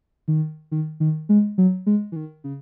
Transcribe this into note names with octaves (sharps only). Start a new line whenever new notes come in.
D#3
D#3
D#3
G#3
F#3
G#3
E3
D#3
C#3